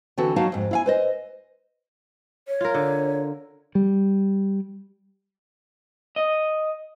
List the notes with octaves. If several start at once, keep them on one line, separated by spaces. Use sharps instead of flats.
D3 E3 C4 F#4 A4
D#2 F#3 D#4 F#4 F5 A5
F2 G#2
E4 F5 G#5
B4 C5 D#5
C#5
F4 A#4
D3
G3
D#5